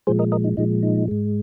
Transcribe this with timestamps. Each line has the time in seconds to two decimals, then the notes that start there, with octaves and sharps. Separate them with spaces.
0.07 A#2 F3 G#3 G#4 C5
0.19 A#4 D#5
0.32 A#4 D#5
0.44 D#4
0.57 A#2 F3 G#3 D#4
0.83 D#4
1.08 G#2 G#3